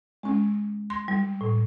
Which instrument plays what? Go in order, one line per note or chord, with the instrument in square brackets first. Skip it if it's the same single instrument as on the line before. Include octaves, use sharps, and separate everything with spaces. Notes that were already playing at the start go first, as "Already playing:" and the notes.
[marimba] G#3 C#4
C6
G3
A2